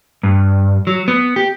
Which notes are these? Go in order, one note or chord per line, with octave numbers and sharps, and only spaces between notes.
G2
F#3
B3
G4